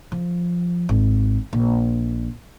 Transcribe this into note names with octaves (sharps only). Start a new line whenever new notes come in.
F3
G#1
A#1